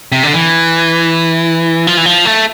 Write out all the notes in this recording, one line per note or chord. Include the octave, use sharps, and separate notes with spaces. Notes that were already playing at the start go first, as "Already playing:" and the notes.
C3
D3
E3
F3
E3
F3
A3